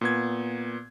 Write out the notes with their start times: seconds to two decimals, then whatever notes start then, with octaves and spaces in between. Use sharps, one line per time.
0.01 A#2 B3 G#6